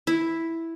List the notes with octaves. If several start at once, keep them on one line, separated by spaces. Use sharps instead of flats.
E4